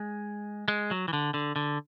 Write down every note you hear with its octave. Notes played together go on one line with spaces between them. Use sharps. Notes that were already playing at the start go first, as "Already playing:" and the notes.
Already playing: G#3
G#3
F#3
E3
D3
D3
D3